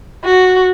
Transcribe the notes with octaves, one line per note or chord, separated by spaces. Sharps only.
F#4